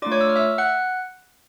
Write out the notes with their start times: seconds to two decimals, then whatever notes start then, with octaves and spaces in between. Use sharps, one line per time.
0.02 A3 D4 F4 D5 D6
0.12 C#5 C#6
0.21 E6
0.29 F6
0.36 E5 E6
0.58 F#5 F#6